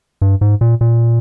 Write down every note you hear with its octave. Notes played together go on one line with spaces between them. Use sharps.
G2
G#2
A#2
A#2